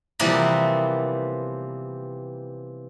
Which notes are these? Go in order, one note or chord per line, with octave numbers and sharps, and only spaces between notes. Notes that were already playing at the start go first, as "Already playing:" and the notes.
C3 E3 F3 G3 A#3 B3